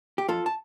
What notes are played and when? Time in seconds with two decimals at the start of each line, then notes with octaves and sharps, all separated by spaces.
0.18 G4
0.28 F2 F4 A4
0.46 A5